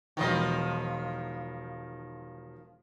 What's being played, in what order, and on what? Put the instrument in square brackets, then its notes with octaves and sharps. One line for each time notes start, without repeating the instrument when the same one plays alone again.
[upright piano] E1 B4 G5 [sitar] D#3 F3 D#5